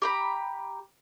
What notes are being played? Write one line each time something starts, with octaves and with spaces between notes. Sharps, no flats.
G4 A#5 B5